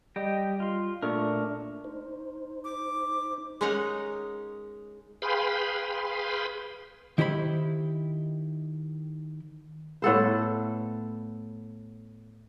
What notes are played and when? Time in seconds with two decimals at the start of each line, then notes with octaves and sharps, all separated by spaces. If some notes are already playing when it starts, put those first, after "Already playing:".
0.16 G3 G4 D#5 G5
0.60 F4 C6
1.02 A#2 A3 D4 A#4 C#6
1.84 D#4 C5
2.65 D6
3.61 G#3 C#4 D#4 A#4 C#5 F#5
5.22 G#4 B4 F5 G5 B5 C6
7.18 D#3 E4 G4 C5 C#5 B5
10.02 A2 B3 A4 C5